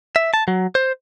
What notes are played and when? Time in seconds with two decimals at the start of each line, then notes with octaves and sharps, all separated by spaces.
0.16 E5
0.34 A5
0.48 F#3
0.75 C5